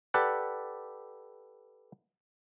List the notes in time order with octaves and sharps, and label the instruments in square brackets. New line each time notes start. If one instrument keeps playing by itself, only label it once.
[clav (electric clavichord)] G4 A4 B4 D5 F#5